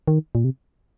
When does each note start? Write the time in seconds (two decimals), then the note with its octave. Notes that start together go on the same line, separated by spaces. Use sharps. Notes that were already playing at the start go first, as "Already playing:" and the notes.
0.08 D#3
0.35 A#2
0.44 C3